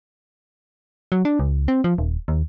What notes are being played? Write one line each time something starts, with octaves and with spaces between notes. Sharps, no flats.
F#3
D4
C#2
C4
F3
D#1
D#2